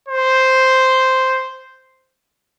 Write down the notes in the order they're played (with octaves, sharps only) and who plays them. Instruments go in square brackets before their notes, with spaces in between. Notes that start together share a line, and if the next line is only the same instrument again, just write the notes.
[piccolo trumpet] C5